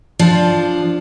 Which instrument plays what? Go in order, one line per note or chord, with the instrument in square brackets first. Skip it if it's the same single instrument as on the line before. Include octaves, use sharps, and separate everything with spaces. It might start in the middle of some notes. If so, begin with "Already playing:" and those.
[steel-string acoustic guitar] F3 D4